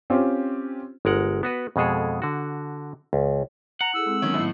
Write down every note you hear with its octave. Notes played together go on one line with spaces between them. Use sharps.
C4 C#4 F4 G4 C5
G1 G#3 A#4 F#5
B3 F#4 B4
F2 B2 G#3 G#4 A4
D3 F#4
C#2
F#5 A#5
E4 G#4 A4 E6
G#3 C4
D#3 F#3 B3 C#4
G#1 A2